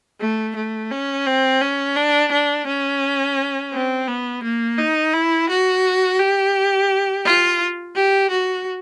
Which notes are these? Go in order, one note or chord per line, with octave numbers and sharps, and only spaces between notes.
A3
A3
C#4
C4
C#4
D4
D4
C#4
C4
B3
A#3
D#4
E4
F#4
G4
F4
G4
F#4